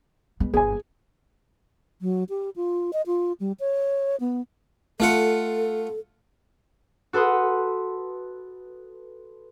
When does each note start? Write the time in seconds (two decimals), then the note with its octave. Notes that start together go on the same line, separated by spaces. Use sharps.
0.40 G#3 B3
0.54 G1 B3 G#4 G#5
2.01 F#3
2.29 G4
2.56 F4
2.93 D#5
3.07 F4
3.40 G3
3.60 C#5
4.20 B3
5.00 A3 F4 A4 F#5
7.13 F#4 A4 B4 C6 D#6